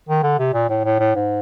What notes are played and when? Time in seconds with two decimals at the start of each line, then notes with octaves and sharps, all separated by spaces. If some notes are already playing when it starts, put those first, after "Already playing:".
0.09 D#3
0.23 D3
0.39 C3
0.53 A#2
0.69 A2
0.84 A2
0.99 A2
1.15 G#2